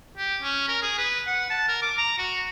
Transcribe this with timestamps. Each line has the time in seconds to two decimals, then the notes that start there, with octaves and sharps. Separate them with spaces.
0.17 G4
0.42 C#4
0.68 A#4
0.82 G#4
0.98 B4
1.27 F#5
1.50 A5
1.68 A#4
1.82 D6
1.98 A#5
2.18 F#4